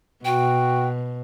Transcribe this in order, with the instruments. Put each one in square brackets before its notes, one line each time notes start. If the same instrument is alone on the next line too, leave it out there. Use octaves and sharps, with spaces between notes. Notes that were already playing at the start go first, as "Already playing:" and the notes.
[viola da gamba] B2 [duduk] F#4 [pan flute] G5